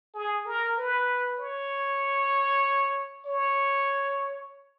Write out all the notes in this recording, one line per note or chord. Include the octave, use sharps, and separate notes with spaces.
G#4
A#4
B4
C#5
C#5